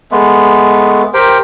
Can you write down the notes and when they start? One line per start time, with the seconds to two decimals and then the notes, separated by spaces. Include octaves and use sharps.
0.11 G#3 A3 B3
1.14 G4 A#4 C5 G5